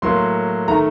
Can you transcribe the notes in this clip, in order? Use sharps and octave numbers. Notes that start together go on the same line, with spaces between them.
A2 F#3 A#3 C6
D#3 A3 A#5